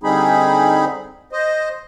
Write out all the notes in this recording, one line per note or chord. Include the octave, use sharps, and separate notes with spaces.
D3 G3 C4 D#4 G#4 B5
C5 D#5